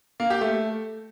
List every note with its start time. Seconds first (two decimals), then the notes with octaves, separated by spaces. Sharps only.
0.20 A#3
0.30 G4
0.41 A3